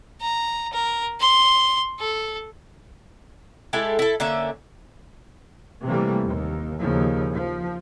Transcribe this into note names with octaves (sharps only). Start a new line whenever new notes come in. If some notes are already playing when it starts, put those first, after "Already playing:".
A#5
A#4
C6
A4
G#3 E4 G4 A4
E4 A4
D3 A#3 C#4 E5
C3 E3 G3 A3 A#3
D#2
D#2 C#3 F3
F3